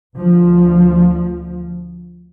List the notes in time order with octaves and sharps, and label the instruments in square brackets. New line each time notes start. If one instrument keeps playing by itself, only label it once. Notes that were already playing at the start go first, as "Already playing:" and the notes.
[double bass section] D2 F3